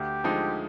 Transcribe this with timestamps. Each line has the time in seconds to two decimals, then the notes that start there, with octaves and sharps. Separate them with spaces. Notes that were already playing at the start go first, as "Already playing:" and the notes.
Already playing: D2 G4
0.24 D3 F3 G#3 D#4